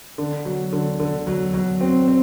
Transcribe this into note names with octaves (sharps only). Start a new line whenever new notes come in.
D3
F#3
D3
D3
F#3
F#3
C4
C4